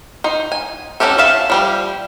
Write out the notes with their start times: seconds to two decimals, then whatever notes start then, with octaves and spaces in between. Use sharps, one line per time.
0.24 D#4 C5
0.52 G#5
1.00 F#3 C#4 F#4 G4 A4
1.18 G#4 A4 E5 F5 A5
1.50 F3 G3 G4